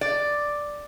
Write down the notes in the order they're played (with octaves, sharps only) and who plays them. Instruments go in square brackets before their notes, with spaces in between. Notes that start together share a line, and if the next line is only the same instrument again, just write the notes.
[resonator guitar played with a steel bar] D5